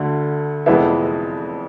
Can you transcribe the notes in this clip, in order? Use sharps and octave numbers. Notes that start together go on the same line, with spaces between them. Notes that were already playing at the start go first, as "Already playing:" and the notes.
Already playing: D2 D3 A3
F1 F2 E3 G#3 B3 E5